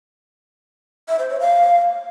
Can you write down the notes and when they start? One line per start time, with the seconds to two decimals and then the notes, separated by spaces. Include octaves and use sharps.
1.08 E5
1.19 C5
1.30 C#5
1.40 F5